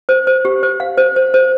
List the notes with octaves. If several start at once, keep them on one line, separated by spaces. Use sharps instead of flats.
C5
C5
G4
C5
F5
C5
C5
C5